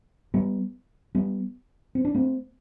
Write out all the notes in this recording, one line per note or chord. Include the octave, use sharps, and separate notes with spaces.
G3 B3
G3 B3
C4
D4
A3 C4